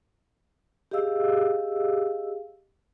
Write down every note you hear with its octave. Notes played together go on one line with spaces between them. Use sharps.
G4 G#4 D#5 F5 E6